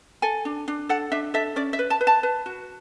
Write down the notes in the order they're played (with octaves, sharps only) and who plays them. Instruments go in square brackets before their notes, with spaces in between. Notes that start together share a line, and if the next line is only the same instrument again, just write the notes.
[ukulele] A4 G#5
D4
D4
A4 F#5
D4 E5
A4 E5
C#4 D5
E5
B4
A5
B4
A5
B4
F#4